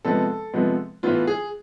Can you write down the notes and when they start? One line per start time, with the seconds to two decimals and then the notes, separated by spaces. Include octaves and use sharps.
0.05 C3 F3 G#3 B3 A4
0.54 C3 F3 G#3 B3
1.03 A2 E3 B3 F4
1.27 G#4